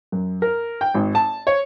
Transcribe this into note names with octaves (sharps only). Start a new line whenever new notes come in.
F#2
A#4
G5
G#1
A5
C#5